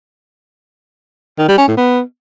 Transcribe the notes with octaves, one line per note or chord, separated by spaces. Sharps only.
D#3
G3
C#4
A2
B3